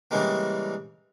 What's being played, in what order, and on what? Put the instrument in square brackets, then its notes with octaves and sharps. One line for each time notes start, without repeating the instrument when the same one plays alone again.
[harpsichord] C#3 E3 G3 G#3 A#3